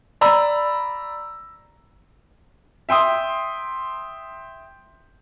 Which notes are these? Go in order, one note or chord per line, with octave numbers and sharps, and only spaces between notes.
D5 A#5 B5 E6
E5 G5 C6 D#6